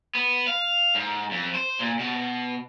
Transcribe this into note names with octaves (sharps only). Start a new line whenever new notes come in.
B3
F5
G#2
F2
C5
A#2
B2